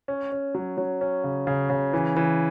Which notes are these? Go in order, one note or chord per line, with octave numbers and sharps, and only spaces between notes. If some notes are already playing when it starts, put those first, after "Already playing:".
C#4
C#4
F#3
F#3
C#4
C#3
C#3
C#3
E3
E3